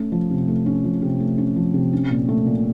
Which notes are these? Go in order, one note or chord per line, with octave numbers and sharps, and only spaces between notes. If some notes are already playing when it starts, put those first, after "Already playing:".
Already playing: A3 C#4
F3
C3
A3
C#4
F3
C3
A3
C#4
F3
C3
C#4
A#2
A3
A#2